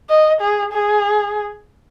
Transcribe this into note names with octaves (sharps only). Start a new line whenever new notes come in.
D#5
G#4
G#4